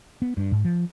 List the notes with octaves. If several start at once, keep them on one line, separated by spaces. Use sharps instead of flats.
B3
G2
G#2
F3